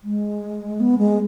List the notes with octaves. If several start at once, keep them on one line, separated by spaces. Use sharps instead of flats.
G#3
B3
G#3